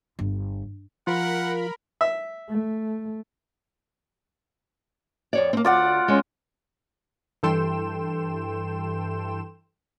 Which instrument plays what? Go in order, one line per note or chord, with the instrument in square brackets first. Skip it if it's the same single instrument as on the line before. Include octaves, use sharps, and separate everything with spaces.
[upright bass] G1
[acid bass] F3 [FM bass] F4 [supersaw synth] A#4 B5 [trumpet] F#5
[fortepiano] E5
[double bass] A3
[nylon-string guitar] F2 C#5 D5
A#3 C4
[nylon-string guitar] D2 [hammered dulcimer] F4 D5 F#5
[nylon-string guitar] G#3 C#4
[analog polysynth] G2 E3 A4 G5 C6 E7